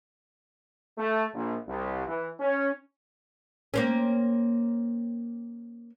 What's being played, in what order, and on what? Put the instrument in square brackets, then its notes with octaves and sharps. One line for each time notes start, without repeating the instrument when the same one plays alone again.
[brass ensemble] A3
A#1
C2
E3
C#4
[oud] A#3 C4 C#4